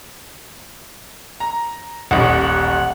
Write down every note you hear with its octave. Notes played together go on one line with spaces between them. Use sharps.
A#5
D#1 A1 F#5